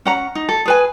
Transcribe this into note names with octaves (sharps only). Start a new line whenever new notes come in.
C#4 F#5 A#5
D#4
A4
G#4 B4 G#5